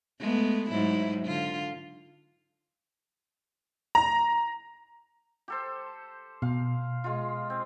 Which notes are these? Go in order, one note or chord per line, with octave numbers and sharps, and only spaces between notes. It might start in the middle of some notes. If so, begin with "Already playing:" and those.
G#3 A3 B3
G#2 F#3 E4
D3 F4
A#5
G4 A4 C5
B2 F5
G#3 F4
C4